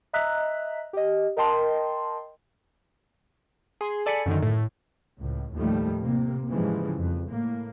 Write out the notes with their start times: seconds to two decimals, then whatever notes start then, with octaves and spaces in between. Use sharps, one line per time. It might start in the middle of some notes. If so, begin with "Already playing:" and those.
0.13 D#5 E5 A#5 F#6 B6
0.93 G4 D#5
1.37 A#4 D#5 G5 A5 C6
3.81 G#4 C6
4.06 A4 D5 G#5 B5 C#7
4.26 F#2 D3 D#3
4.43 A2
5.19 C#2 A2
5.53 D#2 A2 D#3 F3 G3 A3
6.02 C3 A#3
6.49 G#2 C#3 E3 F3 G3 G#3
6.98 F2
7.28 A2 A#3